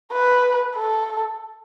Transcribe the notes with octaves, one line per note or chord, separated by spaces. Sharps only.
B4
A4